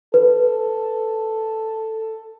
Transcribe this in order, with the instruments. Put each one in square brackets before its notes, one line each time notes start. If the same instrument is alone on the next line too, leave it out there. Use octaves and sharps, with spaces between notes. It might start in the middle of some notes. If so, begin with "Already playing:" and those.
[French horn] A4 [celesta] B4